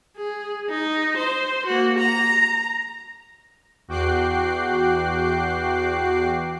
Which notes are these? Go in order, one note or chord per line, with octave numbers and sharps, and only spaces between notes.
G#4
D#4
C5
A#3 F#4
A#5
E2 F#4 G5 D6 F#6 C7